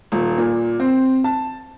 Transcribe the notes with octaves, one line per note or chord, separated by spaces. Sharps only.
D#1
A#2
C4
A5